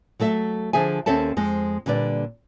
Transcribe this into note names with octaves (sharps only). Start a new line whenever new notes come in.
F#3 A3 A4 E5
D3 F3 G#4 E5 G#5
D#2 C4 C#4 A4 E5 A5
F2 G#3 C4
A#2 D3 G3 B4 D5